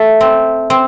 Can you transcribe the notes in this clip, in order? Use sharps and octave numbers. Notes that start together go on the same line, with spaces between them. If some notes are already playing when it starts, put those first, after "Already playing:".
Already playing: A3
C4
C4